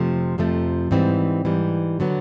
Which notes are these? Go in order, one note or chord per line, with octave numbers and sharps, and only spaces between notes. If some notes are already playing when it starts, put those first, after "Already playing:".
Already playing: F2 C3 F3 A3
F2 C3 F3 A3
G#2 E3 G3 C4
G#2 E3 G3
D3 F#3 B3